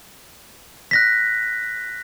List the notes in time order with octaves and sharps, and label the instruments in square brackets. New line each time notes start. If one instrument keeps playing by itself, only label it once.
[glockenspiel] F#6 A#6 B6